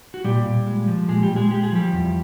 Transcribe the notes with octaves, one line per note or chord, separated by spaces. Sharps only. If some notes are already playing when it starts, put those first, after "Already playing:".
F#4
A#2 G3 G4
A#2
G#3
F3
A#2 G#3 G#4
G3 G4
A#2
G#3 G#4
G#3 G4
G#4
F3 G3 G4
E2